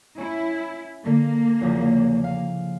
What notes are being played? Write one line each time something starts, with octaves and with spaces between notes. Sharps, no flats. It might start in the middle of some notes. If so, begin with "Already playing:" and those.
C#4 E4
D3 A#3
E2 C#3 F3
F5